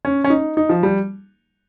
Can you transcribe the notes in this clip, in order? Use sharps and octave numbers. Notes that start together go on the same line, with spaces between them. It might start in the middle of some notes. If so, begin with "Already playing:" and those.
C#4
C#4
D#4
D#4
F3
G3